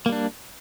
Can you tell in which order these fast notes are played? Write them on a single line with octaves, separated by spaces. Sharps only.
A#3 G3 D4